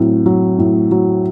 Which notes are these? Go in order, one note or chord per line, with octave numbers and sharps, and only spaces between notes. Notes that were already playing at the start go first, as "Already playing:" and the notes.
Already playing: A2 F#3 C4
F#3
A2
F#3